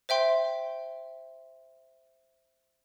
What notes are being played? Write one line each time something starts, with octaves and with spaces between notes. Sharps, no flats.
C5 E5 G5 C6